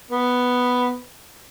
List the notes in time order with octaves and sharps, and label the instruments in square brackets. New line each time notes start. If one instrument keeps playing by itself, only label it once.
[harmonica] B3